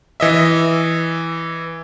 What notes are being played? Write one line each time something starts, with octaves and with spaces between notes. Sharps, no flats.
E3 D#5 E5